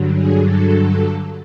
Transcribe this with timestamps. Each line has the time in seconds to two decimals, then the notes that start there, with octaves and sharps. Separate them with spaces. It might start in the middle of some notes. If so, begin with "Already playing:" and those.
Already playing: G2 D3 F#3
0.15 G#4
0.44 A4